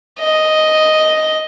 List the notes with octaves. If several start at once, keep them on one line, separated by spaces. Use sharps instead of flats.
D#5